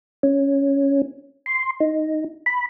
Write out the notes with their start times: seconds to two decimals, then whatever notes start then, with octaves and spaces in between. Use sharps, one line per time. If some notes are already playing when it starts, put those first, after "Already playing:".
0.23 C#4
1.46 C6
1.80 D#4
2.46 B5